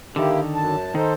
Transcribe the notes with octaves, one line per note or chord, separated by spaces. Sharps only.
D3 D#3 A#3 E4 G4
F#2 A5
D#3 D#4 A4 C5